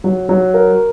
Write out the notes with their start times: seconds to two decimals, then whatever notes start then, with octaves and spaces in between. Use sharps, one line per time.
0.04 F#3
0.29 F#3
0.54 A#4